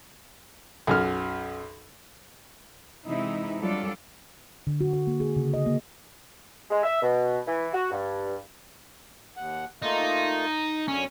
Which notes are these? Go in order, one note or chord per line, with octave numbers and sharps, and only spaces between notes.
B1 F#2 F6
C3 E3 G#3 D#4 E4 E5
F#3 G3 D4 F4 A4 D5
D3
F#4
F#4
A#3
G#4
C#3
D#5
A#3
G#3
E5
B2
E3
F#4
G2
D#2 F#5
A3 A#3 D#4 F4
F#2 D3 C#4